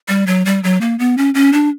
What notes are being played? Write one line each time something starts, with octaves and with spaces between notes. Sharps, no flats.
G3
F#3
G3
F#3
A#3
B3
C#4
C#4
D4